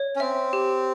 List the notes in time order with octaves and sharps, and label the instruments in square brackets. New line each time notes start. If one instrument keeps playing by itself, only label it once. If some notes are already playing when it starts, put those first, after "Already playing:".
Already playing: [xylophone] C#5
[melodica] C#4
[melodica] C4 [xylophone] E5
[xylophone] G4